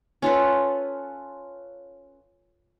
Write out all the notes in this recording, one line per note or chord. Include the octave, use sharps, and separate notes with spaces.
C#4 F4 A4 B4